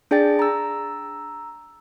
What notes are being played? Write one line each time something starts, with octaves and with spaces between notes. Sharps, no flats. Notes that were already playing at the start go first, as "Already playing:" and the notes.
D4 G#4 D5 G5 A6
A#5 E6